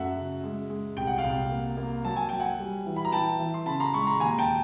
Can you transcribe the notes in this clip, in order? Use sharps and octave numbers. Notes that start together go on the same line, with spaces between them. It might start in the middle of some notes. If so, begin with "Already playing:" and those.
Already playing: F#2 A3 E5 F#5
C#3
G#3
G#3
C2 G5
F#5
F5 G5
C2
A#3
A#3
F#3 A5
G#5
F#3 G5
F#5 G#5
G3
E3
B5
A#5
E3 G5 A5
E3
C6
C#3 A5 B5
A#5 C6
G#3 B5 C#6
A#5 C6
D#2 G#5 A#5
A#5
G5 A5